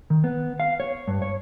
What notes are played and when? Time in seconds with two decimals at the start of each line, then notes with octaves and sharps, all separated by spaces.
0.10 D#3
0.24 B3
0.60 F5
0.80 C#5
1.08 G2
1.22 C#5